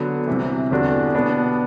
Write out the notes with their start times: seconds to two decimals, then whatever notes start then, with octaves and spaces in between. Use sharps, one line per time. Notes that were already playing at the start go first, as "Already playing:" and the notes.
Already playing: D3 F#3 B3
0.27 C2 C3 E3
0.71 E2 D3 G3 D4 F#4
1.15 B2 G3 B3 D4